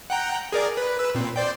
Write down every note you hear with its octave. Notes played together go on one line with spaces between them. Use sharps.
F#5 G5 A#5
G#4 A#4 D5
B4
B4 E6
A#2 C4
C5 D5 G5